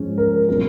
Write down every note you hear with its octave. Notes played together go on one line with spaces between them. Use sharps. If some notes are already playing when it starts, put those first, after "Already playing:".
Already playing: G#2 F3 G#3 C#4
A#4
B2 F#3 C#4 A#4